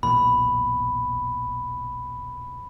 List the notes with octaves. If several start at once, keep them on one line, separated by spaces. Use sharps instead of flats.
B1 E2 A#2 B5